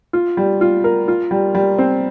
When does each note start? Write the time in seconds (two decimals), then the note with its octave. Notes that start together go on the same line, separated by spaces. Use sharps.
0.13 F4
0.37 G3
0.61 F4
0.84 A#4
1.08 F4
1.31 G3
1.55 G3
1.79 C4